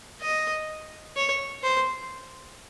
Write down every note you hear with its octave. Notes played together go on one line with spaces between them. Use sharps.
D#5
C#5
C5